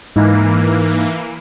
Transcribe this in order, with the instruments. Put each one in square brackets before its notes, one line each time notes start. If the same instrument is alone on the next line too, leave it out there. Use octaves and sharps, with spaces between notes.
[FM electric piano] G#2 D#4 [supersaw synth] E3 A#3